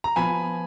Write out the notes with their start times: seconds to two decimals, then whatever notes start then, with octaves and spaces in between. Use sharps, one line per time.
0.04 A#5
0.16 F3 B3 F4 G#5 B5